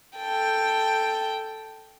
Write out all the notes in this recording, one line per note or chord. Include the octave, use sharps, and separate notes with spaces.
A4 G5